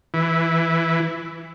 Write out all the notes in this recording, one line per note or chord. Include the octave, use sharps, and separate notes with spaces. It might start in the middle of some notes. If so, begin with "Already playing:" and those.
E3